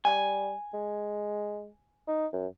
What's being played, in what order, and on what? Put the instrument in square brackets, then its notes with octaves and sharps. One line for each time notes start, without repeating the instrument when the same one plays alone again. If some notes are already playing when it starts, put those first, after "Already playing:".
[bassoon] G3 [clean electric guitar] G#5
[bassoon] G#3
D#4
F#2